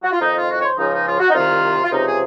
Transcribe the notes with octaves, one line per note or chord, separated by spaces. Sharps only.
F#4
F4
F2 D#3 D#4
F4
F#4
C#5
C5
C#2 C#3 F3 D#4
D#4
F4
F#4
D#4
C2 C3 D#3 F4
F4
C#2 C3 F3 D#4
G#4